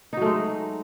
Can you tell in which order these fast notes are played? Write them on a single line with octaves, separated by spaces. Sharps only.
D#4 F#3 A3 G#3